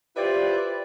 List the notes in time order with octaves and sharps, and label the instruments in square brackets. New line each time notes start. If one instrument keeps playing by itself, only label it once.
[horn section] E4 F4 G4 B4 C5 D5